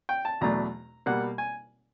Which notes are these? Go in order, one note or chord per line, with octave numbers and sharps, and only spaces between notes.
G5
A5
E2 B2 F#3 A3 D4 A#5
B2 G3 A#3 F#5
G#5